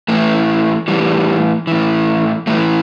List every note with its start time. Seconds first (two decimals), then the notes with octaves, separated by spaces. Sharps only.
0.08 A2 E3 A3
0.88 A2 E3 G3
1.67 A2 E3
2.47 A2 E3 A3